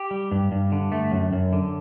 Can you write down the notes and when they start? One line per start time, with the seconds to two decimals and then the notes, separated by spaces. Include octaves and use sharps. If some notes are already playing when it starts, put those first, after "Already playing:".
Already playing: G4
0.11 G3
0.32 G2
0.52 G2
0.72 D3
0.92 A3
1.11 F#2
1.33 F#2
1.53 D3